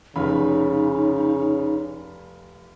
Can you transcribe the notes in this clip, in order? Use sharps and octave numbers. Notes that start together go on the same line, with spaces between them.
F1 C#3 D#4 F4 B5